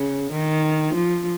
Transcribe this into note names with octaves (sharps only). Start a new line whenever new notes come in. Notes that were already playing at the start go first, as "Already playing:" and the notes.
Already playing: C#3
D#3
F3